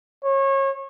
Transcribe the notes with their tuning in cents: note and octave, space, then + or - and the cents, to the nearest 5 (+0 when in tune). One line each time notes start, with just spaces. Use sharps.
C#5 -30